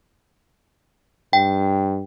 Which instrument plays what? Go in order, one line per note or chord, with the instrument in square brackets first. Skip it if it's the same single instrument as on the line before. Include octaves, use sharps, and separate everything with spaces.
[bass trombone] G2 [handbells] G5